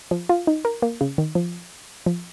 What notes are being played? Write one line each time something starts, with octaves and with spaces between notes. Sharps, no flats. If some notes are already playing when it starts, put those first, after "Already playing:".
F3
F4
D#4
A#4
A#3
C#3
D#3
F3
F3